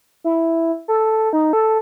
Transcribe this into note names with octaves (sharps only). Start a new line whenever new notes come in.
E4
A4
D#4
A4